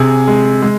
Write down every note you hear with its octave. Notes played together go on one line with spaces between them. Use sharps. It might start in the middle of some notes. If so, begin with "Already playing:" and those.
Already playing: C3 G#4 G#5
G#3
G#3